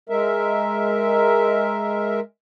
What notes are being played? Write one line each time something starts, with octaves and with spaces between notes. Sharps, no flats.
G#3 A#4 E5